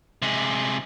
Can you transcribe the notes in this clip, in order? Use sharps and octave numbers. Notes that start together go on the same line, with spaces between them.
C3 G#3